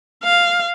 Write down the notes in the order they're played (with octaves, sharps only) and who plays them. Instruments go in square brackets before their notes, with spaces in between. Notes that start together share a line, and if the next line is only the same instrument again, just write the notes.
[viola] F5